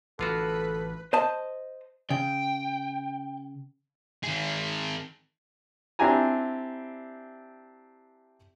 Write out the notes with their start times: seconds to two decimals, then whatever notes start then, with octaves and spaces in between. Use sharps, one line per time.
0.19 A1 D3 F4 F#4 A4 B4
1.13 C5 D#5 A5
2.10 C#3 G5
4.23 D#3 G#4
5.99 C4 D4 E4 G4 G#5 A#5